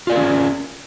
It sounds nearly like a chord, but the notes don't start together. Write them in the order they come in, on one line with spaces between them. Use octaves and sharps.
F4 D5 A#4 G#4 C#4